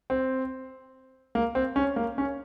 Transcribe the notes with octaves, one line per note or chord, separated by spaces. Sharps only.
C4
A#3
C4
C#4
A#3
C#4